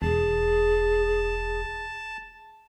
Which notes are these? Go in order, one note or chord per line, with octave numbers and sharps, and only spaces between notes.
E1 G#4 A5